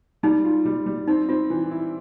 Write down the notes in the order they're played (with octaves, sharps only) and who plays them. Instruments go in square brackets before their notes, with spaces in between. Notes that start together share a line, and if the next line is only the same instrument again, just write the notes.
[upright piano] G3 [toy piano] D#4
[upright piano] F4
G3
G3
[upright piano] C4 [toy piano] D#4
[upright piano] C4 [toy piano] F4
[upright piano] E3
E4